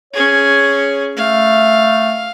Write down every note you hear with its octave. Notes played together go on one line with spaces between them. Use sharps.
C#4 G#4 C#5
A3 F5